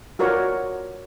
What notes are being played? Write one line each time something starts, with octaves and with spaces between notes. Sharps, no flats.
F4 F#4 A#4 C#5 D5 C#6